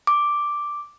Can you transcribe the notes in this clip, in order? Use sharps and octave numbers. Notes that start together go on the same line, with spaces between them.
D6